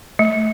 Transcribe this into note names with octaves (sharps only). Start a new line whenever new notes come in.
A3